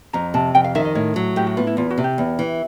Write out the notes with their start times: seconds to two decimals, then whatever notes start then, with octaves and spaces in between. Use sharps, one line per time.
0.13 F2 A#5
0.34 C3 A5
0.55 F2 G5
0.64 F5
0.75 D#3 E5
0.85 D#5
0.95 A2 C#5
1.16 F#3
1.36 A2 G4
1.47 F#4
1.57 B3 F4
1.67 E4
1.77 E2 F4
1.90 F#4
1.98 C3
2.04 G4
2.18 E2
2.39 E3